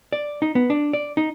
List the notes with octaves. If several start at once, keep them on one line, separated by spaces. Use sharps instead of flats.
D5
D#4
B3
D4
D5
D#4